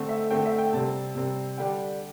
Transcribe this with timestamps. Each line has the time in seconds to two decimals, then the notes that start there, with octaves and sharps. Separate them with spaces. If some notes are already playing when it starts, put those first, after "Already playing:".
Already playing: D3 A3 C4
0.09 E5
0.31 D3 A3 C4 G5
0.45 E5
0.58 G5
0.73 C3 G3 C4 A5
1.15 C3 G3 C4
1.58 D3 G3 D4 G5